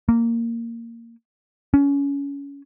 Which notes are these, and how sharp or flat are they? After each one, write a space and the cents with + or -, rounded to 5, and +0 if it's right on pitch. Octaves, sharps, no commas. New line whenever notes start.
A#3 -10
C#4 +25